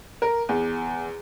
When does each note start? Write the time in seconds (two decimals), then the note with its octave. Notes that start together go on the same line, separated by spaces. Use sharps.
0.22 A#4
0.49 E2